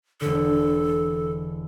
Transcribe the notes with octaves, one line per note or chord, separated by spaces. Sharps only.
E1 D3 A4